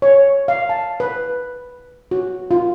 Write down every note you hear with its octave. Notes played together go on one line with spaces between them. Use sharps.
C#5
F5
A5
B4
F#4
F4